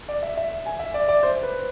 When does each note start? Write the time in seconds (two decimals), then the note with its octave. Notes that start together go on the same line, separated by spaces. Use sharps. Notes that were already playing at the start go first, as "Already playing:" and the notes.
0.09 D5
0.23 E5
0.37 E5
0.66 G#5
0.80 E5
0.94 D5
1.09 D5
1.23 C5
1.43 B4